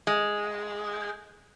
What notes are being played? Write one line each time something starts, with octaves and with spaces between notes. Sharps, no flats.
G#3